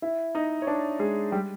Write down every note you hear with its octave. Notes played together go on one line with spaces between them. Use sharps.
E4 E5
D#4 D#5
C#5
D4 D5
G#3 G#4
G3 G4